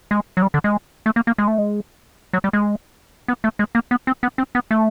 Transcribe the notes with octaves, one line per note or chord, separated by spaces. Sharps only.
G#3
F#3
G3
D3
G#3
A3
A#3
A#3
G#3
A3
G#3
F#3
G3
G#3
B3
A3
G#3
A#3
B3
C4
B3
C4
B3
A3